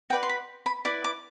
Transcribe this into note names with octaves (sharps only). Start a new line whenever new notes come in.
F#4 B4 D5 G5
C6
B5
B5
E4 B4 D5 D6
D6